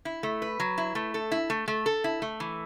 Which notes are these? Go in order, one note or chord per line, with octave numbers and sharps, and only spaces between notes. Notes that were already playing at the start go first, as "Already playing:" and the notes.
E4
A3
B4
F#3
E4
A3
A4
E4
A3
A3
A4
E4
A3
E3